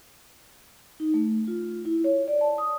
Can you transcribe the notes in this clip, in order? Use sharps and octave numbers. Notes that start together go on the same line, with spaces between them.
D#4
A3
F4
E4
C#5
D5
A5
D#6